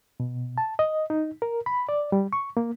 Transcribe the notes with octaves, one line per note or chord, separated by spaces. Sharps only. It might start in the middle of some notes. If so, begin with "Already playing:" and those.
B2
A5
D#5
D#4
A#4
B5
D5
G3
C#6
A#3